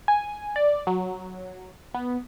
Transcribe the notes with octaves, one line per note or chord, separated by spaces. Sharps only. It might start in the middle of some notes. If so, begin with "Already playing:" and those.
G#5
D5
F#3
B3